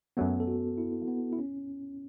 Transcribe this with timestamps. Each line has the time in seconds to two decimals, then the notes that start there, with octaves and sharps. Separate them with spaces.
0.17 F#2 F#3 A3 B3
0.40 A4
0.48 F#4
0.78 E4
1.08 B3
1.33 E4
1.39 C#4